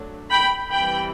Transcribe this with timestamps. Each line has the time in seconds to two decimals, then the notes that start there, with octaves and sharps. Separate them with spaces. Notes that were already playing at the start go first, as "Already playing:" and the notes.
Already playing: F#3 A3 D4
0.31 G5 B5
0.72 E3 G3 C4 G5 B5